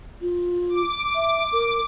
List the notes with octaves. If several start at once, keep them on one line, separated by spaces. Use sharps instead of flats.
F4
D6
E5
A#4